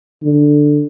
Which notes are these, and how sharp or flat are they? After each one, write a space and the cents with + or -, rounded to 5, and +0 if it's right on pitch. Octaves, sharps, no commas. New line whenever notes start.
D3 +5